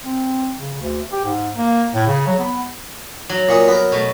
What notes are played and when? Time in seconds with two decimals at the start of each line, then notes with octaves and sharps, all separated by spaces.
0.05 C4
0.57 C#3
0.81 D2
1.12 G4
1.25 G#2
1.57 A#3
1.94 A2
2.07 C#3
2.27 F#3
2.39 B3
3.29 F#3
3.49 A#2 C#6 D#6
3.68 B3 A#4
3.92 B2 A3